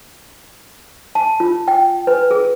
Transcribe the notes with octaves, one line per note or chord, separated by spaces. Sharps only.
A5
F4
G5
B4
G#4